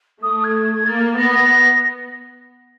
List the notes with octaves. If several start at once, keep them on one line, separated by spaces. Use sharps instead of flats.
A3 D#6
D#6
G#6
A#3 A6
B3 A#6
A#6